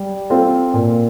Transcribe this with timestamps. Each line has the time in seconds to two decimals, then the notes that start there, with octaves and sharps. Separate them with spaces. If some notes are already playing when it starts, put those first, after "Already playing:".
Already playing: G3
0.30 C4 F4 A4
0.74 A#2